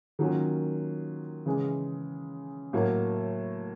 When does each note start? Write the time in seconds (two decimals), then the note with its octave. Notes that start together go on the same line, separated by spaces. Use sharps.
0.19 D#3 F#3 A#3 C#4 F4
1.46 C#3 E3 G#3
2.73 A2 F#3 A#3